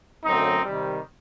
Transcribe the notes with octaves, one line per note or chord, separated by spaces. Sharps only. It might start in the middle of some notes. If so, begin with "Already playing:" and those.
F#2 D3 F#3 A3 C4 D#4
C3 D#3 G3